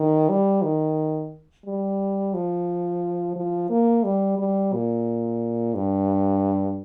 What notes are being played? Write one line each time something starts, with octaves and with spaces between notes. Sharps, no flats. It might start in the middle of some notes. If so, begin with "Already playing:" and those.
Already playing: D#3
G3
D#3
G3
F3
F3
A#3
G3
G3
A#2
G2